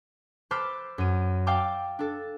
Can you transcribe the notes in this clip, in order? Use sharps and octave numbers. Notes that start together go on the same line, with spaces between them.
B4 C5 A5 D6 E6 F6
F#2 D#7
F5 G5 A5 D6 E6
D4 A4